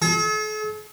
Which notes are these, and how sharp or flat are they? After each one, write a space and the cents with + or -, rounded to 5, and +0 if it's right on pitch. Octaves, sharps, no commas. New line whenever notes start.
A4 -45